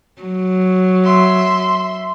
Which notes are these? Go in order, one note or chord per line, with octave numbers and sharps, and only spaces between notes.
F#3
E5 C6